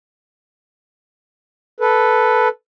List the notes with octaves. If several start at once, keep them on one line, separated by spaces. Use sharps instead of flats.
A4 B4